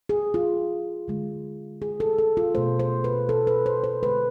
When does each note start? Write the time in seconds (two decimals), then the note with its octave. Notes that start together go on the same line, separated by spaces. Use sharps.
0.09 G#4
0.34 F4
1.08 D3 G#3
1.82 G#4
2.00 A4
2.18 A4
2.37 F4
2.55 B2 A3 C5
2.79 C5
3.04 B4
3.29 A4
3.47 B4
3.66 C5
3.84 C5
4.03 D3 G#3 B4